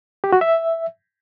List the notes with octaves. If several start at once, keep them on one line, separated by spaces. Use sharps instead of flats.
G4
F#4
E5